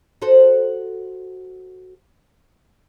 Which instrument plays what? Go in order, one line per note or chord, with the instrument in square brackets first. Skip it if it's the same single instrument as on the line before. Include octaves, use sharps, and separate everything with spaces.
[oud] F#4 A4 C5